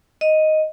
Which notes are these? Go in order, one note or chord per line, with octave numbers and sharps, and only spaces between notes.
D#5